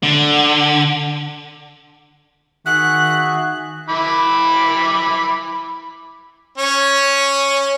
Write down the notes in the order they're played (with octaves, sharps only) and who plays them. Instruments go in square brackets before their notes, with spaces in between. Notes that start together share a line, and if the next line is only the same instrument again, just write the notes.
[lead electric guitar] D3
[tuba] D#3 [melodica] F#4 G#4 E5 [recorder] F#6
[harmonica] E4 B5 D6
C#4 C#5